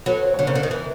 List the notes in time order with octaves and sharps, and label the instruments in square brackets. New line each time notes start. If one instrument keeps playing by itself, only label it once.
[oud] F#3 [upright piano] A4 B4
[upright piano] C5
[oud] D3 [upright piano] C#5
[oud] C#3 [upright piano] A#4 C5
[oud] D3
D#3
E3